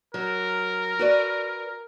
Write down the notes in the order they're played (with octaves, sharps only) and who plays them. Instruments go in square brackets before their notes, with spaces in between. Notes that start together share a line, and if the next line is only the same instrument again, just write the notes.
[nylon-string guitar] F#3 [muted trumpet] A#4
[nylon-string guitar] F#4 B4 D5